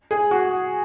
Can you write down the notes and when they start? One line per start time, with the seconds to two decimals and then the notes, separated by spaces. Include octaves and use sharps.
0.11 G#4
0.31 F#4